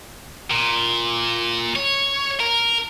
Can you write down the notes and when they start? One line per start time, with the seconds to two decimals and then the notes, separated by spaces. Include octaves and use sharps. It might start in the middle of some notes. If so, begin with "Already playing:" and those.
0.50 A#2
1.76 C#5
2.40 A#4